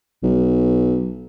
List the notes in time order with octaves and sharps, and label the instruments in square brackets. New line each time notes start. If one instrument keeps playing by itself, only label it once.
[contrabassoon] B1